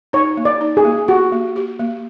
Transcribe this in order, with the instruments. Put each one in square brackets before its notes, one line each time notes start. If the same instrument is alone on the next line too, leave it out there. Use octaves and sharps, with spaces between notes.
[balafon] D#4 [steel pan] C#5
[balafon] A#3
[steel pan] D5
[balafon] D#4
[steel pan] G#4
[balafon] A#3
[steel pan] F#4 [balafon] G4
[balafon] A#3
G4
A#3